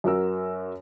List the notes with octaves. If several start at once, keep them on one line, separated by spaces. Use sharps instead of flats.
F#2 F#4 A#4 E6